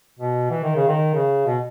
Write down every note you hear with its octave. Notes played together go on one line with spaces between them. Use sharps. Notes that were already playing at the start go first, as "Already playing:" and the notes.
B2
E3
D#3
C#3
D#3
C#3
B2